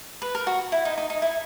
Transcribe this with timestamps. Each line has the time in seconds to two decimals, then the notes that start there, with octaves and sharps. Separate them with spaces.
0.22 B4
0.35 A#4
0.47 F#4
0.72 E4
0.85 D#4
0.98 D#4
1.10 D#4
1.22 E4